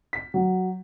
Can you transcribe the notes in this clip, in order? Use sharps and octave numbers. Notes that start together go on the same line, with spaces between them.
B6
F#3